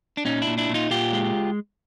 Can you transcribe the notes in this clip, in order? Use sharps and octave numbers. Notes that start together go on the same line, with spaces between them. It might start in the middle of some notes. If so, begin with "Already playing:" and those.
D4
A#2 C#4 D#4
D4 E4
A#2
D4 E4
A#2
D#4 F4
A#2 F4 G4
G#3